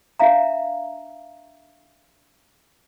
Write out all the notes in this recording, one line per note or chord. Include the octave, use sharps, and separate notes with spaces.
D4 E5 F5 A#5